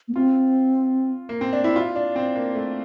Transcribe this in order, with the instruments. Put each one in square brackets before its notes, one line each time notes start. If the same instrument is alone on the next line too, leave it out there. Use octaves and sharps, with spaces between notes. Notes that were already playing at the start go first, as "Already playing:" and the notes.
[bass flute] A#3
[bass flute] C4 [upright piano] F4
[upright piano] A#3
C4
D4
E4
F4
D4
C4
A#3
A3